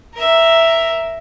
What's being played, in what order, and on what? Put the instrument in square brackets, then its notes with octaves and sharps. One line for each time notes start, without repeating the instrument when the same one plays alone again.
[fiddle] A#4 E5